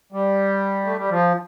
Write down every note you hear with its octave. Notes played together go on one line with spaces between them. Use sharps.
G3
A3
G3
F3